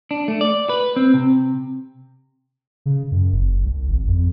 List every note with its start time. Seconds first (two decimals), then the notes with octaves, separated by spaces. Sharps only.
0.11 D4
0.28 A3
0.41 D5
0.69 B4
0.96 C4
1.14 C3
2.86 C#3
3.11 F#2
3.32 F#1
3.64 C2
3.89 G#1
4.07 F2